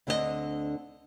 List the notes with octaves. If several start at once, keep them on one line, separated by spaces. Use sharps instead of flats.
D2 D3 C4 D4 G#4 D#5